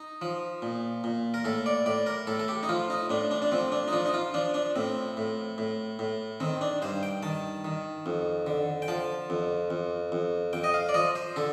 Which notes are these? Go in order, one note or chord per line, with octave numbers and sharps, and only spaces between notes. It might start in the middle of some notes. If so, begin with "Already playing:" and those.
Already playing: D#4
F3
A#2
A#2
A#4
A2 A4
D5
A2 D5
A#4
A2 A4
A4
G4
D#4
F3 F4
D#4
A2 D4
D4
D4
F3 C4
D4
D#4
F3 D4
D#4
F4
F3 D4
D4
A2 C4
A2
A2
A2
D#3 C4
D4
G2 C5
G5
D#3 A5
D#3
F2
D3
G5
F3 A5
F2
F2
F2
F2 G5
D#5
F5
D5
F3 D#5
C5
D3 A4